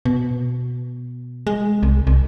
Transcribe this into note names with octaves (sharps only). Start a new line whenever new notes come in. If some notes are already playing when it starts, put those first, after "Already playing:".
B2
G#3
C2
C2